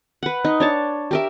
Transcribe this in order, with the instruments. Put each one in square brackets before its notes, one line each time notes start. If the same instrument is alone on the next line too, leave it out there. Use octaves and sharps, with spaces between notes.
[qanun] B4 F#5
D#4
D4 C#5 A5
G4 A#4 E5